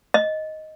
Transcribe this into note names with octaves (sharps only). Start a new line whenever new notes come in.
D#5